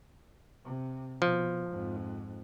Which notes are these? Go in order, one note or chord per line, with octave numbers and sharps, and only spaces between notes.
C3
B2 F3
F2 G#2